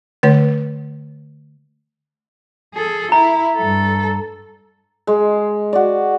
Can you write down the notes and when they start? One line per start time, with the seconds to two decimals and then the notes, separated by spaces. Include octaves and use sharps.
0.23 D3 A3 C#5
2.74 G#4 A4
3.12 E4 A#5
3.56 G2 A4
5.07 G#3
5.73 F#4 D5